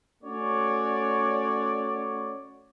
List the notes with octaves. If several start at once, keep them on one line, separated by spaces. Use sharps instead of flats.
A3 C#4 F#4 C#5 D5